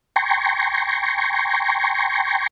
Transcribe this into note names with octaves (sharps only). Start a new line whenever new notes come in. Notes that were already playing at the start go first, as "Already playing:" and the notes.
G5 G#5 A#5 C6 C#6